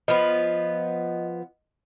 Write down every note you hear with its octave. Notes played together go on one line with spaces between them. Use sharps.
F3 B3 D#5